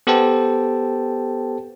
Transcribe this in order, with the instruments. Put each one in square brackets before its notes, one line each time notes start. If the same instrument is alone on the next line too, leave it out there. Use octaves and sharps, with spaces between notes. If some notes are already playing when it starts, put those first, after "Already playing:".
[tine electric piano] B3 G4 A4 C5 G5 A5